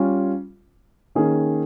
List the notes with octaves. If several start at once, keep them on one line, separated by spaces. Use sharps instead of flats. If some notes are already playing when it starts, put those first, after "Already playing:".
Already playing: G3 C#4 F4
D#3 A#3 C#4 G#4